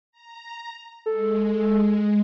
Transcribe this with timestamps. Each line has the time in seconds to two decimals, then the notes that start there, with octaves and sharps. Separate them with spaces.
0.12 A#5
1.06 G#3 A4